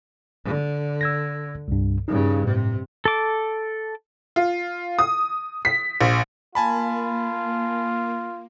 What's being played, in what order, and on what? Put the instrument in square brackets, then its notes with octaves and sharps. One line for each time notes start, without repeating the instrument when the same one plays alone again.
[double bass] D3
[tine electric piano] E6 G#6 A#6
C2 G2
[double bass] G2 C#3 [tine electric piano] D#4
[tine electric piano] A2 [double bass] C3
[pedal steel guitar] A4 D6
[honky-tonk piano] F4
D#6
B6
A#1
[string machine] A#3 [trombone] F4 [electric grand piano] G#5 A5 B5